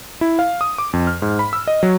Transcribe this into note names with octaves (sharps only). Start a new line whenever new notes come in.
E4
F5
D#6
D6
F2
F6
G#2
B5
E6
D#5
F#3